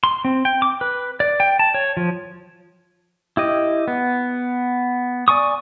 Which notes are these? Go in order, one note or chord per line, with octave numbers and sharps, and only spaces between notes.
C6
C4
G5
D6
B4
D5
G5
A5
C#5
F3
E4 G4 D#5
B3
D5 G#5 C#6 D#6